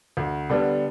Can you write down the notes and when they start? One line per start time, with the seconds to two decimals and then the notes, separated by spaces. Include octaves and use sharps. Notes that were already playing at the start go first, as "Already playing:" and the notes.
0.17 D2
0.50 D3 G3 B3 D4